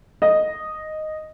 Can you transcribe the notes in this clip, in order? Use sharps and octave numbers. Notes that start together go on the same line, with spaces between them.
D#5